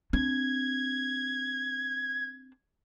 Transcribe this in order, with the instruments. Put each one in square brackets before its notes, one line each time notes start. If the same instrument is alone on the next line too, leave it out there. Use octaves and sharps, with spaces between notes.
[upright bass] C4 D4 [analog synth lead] G#6